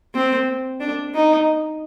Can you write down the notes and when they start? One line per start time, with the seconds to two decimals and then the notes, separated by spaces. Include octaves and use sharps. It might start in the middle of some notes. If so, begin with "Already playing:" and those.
0.15 C4
0.81 D4
1.15 D#4